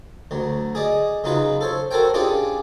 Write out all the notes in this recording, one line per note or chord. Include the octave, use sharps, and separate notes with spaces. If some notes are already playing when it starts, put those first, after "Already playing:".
D2 F#3
G#4 D5 D#5
C#3 F#3 D#4 F4 B4
A4 C5 C#5
F#4 A4 A#4 C5 C#5 G5
C#4 D4 F4 G4 G#4 D5